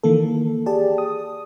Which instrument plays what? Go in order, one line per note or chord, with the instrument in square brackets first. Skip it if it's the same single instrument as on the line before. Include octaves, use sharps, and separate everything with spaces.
[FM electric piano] D#3 E3 A#3 A4
G4 G#4 D5 A5
D#6